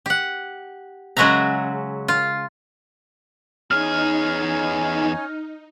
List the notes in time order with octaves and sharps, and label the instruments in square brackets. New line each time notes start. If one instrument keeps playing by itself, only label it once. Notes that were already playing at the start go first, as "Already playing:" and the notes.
[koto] G4 F#5
C#3 F#3 G#3 F#4 E5 A#5
F4
[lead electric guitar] E2 G#4 [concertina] C#4 C#5 G#5 [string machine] D#4 [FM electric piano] F6